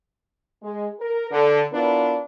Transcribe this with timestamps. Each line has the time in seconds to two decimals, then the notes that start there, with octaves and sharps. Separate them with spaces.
0.63 G#3
1.00 A#4
1.31 D3
1.72 B3 D4 E4 F4 A#4 B4